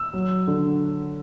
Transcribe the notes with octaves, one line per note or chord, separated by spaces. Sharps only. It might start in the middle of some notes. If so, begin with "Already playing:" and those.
Already playing: E6
F#3
D3